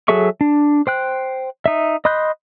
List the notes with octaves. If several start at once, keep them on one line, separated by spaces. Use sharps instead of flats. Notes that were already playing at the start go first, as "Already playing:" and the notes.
F#3 G#4 A4 E5 C#6
D4
C5 G5 F#6
D#4 E5
D#5 B5 C6 F#6 G6